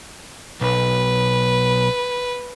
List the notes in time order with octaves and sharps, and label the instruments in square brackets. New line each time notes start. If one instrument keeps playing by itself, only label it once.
[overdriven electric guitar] B1 [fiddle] B4